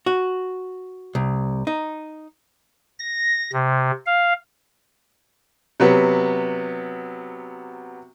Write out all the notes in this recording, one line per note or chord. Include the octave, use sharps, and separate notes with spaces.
F#4
C2
D#4
A#6
C3
F5
C3 F#3 B3